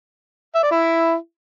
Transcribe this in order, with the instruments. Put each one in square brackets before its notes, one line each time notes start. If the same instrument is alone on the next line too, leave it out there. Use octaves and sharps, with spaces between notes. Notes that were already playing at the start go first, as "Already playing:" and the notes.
[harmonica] E5
D5
E4